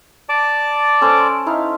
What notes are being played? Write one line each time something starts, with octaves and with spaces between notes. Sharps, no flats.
D5 A5 D6
C#4 A4 C5
D#4 E4 F5